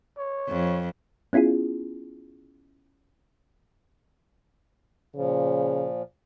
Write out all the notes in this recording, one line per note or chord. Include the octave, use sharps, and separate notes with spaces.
C#5
F2
B3 C#4 E4 F4 G#4
A#2 C#3 F3